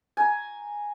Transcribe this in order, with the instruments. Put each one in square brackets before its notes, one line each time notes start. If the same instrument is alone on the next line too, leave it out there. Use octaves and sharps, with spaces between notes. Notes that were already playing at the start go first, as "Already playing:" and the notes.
[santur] G#5 A#5